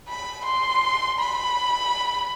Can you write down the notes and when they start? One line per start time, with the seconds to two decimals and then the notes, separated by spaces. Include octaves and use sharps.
0.08 B5
0.45 C6
1.20 B5